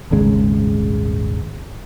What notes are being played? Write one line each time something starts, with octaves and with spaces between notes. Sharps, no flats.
D#1 G#1 C#3 G#3